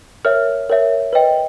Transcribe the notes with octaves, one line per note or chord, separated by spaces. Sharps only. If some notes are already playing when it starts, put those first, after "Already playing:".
A#4 C#5 E5 F6
A#4 C#5 E5
B4 D#5 G5